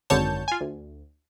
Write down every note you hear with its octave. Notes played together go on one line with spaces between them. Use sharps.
G#1 F#2 D3 C#5 A5 G6
F4 G#5
D2